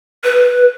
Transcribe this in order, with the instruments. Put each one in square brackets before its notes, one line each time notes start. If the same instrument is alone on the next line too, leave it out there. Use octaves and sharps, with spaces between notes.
[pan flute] B4